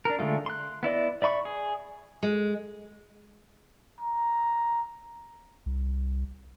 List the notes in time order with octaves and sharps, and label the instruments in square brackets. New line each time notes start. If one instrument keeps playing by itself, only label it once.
[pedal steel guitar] D4 A#4
D3 G#3 A3 F4
C6 F#6
B3 E4 D5 D#5
D5 E5 B5 C#6
G#4
[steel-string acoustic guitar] G#3
[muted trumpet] A#5
[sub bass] C2